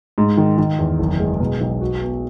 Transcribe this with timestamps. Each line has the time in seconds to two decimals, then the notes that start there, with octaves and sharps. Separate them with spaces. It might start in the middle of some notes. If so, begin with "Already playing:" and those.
0.18 G#2
0.37 D#3
0.58 D#3
0.79 E2
0.99 F#1
1.20 G#3
1.40 B2
1.61 B1
1.81 F#4
2.02 B3